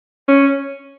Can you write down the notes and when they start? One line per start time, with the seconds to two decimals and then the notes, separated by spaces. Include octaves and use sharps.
0.28 C#4